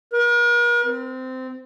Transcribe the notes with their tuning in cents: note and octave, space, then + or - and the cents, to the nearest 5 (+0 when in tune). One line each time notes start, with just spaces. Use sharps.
A#4 +45
C4 -20